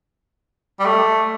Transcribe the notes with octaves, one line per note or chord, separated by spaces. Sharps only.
G3
A3